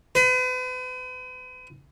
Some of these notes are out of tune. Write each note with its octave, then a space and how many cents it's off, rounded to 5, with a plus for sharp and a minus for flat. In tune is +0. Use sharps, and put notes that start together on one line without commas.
B4 +40